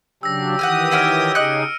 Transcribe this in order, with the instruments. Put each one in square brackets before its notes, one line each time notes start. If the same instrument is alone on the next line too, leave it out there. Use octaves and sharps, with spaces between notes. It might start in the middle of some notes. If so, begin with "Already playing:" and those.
[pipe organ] C#3 F#3 D4 [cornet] G4 [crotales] E6 A#6
[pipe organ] D#3 E3 D#6 [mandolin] F#5 G#5 F6
[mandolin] E4 F#4 C#5 [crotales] F6 D7 D#7
[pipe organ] C#3 D#4 G#4 [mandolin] D#5 F#6 [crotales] C#7